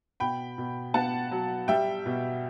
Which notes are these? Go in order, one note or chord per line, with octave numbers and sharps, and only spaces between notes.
B2 G5 B5
B2
B3 F#5 A5
F#3
G3 E5 G5
B2